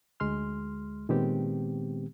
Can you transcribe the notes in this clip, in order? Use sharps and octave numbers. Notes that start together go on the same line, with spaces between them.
D2 G#3 C6 F6
A#2 D#3 G#3 B3 C4 G4